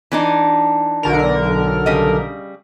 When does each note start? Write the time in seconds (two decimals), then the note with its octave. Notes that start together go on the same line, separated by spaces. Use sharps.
0.12 E3 D4 D#4
1.03 B1 D3 A#4
1.86 C#3 G3 D#5